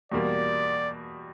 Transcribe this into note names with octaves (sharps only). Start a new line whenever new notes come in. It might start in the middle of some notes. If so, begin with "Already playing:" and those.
E2 B2 G3 A#3 D5